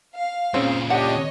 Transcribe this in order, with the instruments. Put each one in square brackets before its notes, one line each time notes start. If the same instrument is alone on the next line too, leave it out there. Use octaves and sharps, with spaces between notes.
[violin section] F5
[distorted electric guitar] A#2 C#3 [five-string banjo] C4 C#4 G#4
[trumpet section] D4 G4 [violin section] C#5 D#5 [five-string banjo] F#5 G5